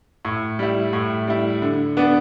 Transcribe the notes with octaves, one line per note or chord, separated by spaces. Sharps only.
A2
G3 E4
A2
G3 E4
D3
B3 D4